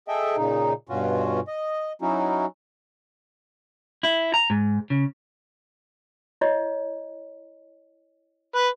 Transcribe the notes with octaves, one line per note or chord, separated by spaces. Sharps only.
G#4 A4 D#5 E5 G5
A#2 C#3 D#4
G2 B2 C#4 F4 F#4
D#5
F#3 C#4 D#4 E4 F#4
E4
A#5
G#2
C#3
E4 C#5 D#5
B4